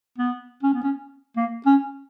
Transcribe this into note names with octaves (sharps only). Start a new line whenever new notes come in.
B3
C#4
B3
C#4
A#3
C#4